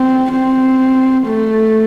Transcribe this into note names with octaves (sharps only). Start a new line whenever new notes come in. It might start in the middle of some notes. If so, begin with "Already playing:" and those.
Already playing: C4
C4
A3